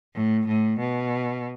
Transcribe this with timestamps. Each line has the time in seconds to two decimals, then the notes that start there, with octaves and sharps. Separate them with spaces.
0.15 A2
0.47 A2
0.79 B2